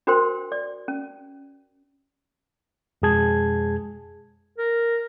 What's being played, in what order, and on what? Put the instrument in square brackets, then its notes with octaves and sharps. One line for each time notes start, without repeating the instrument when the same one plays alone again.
[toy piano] D4 F#4 A#4 C5 G5 C6
D5
C#4
[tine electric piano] F2 B2 G#3 G#4 A5 G#6
[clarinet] A#4